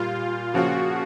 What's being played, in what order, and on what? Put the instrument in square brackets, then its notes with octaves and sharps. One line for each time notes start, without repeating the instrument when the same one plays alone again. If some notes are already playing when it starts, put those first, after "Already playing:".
Already playing: [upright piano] A#2 G3 A#3 [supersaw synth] F4
[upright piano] C#3 F3 A#3 C#4 F4 [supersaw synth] F#4